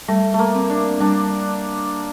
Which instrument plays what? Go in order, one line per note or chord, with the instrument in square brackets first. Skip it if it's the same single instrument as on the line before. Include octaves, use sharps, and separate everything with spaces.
[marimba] G3 [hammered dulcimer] A3
[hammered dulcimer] A3
A#3
[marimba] C4
[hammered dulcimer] D4
[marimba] G3 [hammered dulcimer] D4